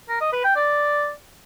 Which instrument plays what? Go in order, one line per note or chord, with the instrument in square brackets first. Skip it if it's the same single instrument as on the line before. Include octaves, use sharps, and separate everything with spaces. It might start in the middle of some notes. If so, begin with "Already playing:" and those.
[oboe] A#4
D#5
B4
G5
D5